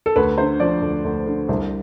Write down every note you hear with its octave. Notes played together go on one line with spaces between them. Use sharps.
A4
D2 B4
D3 C5
F3 D5
D2
D2
D3
C2 C5